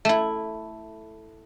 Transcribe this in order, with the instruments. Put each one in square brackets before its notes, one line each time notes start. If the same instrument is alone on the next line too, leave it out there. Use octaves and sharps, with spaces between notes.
[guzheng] A3 E4